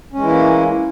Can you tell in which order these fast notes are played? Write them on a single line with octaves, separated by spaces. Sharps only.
C#4 G#3 E3 E4 A#3